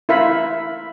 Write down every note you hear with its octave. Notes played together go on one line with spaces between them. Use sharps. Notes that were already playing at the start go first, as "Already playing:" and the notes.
E4 A#4 E5 F5 B5